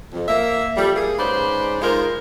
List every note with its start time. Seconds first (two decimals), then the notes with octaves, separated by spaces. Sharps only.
0.13 F2
0.28 A#3 E5
0.76 F2 G3
0.95 A#3 G#4
1.18 G#2 C#4 B4 C5 D5
1.81 G#3 D#4 F4 A#4 C5